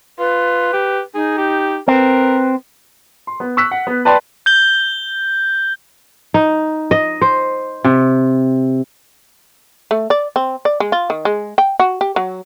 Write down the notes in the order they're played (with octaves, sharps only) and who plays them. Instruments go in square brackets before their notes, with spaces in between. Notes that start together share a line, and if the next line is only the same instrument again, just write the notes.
[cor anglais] F4 [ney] B4
[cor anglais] G4
[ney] D#4 [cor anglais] G#4
[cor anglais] G4
[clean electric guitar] C4 [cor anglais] A#4 [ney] B4
[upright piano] C6
B3
C#6 E6 F#6 B6
F#5
B3
B4 D5 G5 A5 C6
[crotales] G6 G7
[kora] D#4
D#5
C5
C3
[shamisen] A3
D5
C4
D5
G#3
F4
D#3
G#3
G5
F#4
G4
F#3